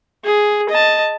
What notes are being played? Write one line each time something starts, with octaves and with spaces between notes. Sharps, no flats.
G#4
D#5 A5